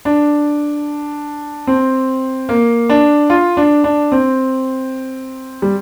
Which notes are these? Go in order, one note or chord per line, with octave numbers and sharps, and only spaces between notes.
D4
C4
A#3
D4
F4
D4
D4
C4
G3